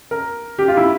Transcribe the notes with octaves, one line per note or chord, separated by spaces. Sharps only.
A#4
G4
F4
E4